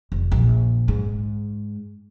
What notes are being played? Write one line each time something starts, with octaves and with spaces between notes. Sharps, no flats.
F1
A#1
G#2